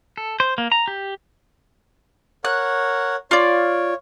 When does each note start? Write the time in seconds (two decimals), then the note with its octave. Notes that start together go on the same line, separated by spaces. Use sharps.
0.17 A4
0.40 C5
0.58 A#3
0.72 A#5
0.88 G4
2.45 A#4 C#5 F#5 F#6
3.31 F4 C#5 D5